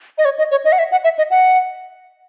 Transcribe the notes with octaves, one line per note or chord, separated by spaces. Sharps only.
D#5
C#5
D#5
C#5
D#5
F#5
E5
F#5
E5
D#5
F#5